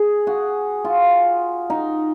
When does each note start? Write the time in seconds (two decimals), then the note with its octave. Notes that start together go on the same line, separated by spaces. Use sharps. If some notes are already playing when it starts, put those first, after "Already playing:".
Already playing: G#4
0.27 F#4
0.84 F4
1.70 D#4